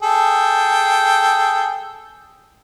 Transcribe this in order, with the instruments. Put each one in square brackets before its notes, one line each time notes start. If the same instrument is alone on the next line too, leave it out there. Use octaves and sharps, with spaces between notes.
[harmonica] G#4 A4 G5